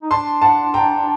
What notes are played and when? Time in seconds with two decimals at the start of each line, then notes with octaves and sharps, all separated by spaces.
0.03 D#4
0.11 D4 A5 C6
0.42 F#5 A5
0.74 G5 A#5